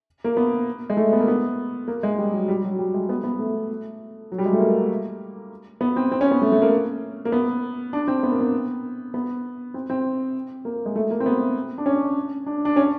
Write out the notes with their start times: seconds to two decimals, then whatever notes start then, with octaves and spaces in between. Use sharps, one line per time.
0.24 A#3
0.37 B3
0.90 G#3
0.97 A3
1.13 B3
1.20 A#3
1.28 B3
1.88 A#3
2.03 G#3
2.18 G3
2.33 F#3
2.48 G3
2.64 F#3
2.79 G3
2.94 G#3
3.09 B3
3.24 B3
3.39 A3
4.32 F#3
4.38 G3
4.46 G#3
4.53 A3
4.60 A#3
5.81 B3
5.96 C4
6.11 C4
6.21 C#4
6.31 B3
6.42 A3
6.52 A3
6.62 A#3
7.25 A#3
7.32 B3
7.93 D4
8.08 C4
8.23 B3
8.32 A#3
8.40 B3
9.14 B3
9.74 C4
9.90 C4
10.65 A#3
10.86 G#3
10.95 A3
11.11 A#3
11.20 C4
11.26 B3
11.78 D4
11.86 C#4
12.46 D4
12.65 D4
12.76 C#4